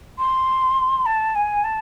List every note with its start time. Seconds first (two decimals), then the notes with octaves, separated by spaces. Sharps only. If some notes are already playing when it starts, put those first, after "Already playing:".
0.18 C6
1.06 A5
1.35 G#5
1.64 A5